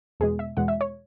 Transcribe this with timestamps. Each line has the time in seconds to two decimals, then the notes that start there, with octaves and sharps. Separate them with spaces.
0.20 E2 B2 G#3 G#4
0.39 E5
0.57 E2 B2 G#3 F#5
0.68 E5
0.81 C#5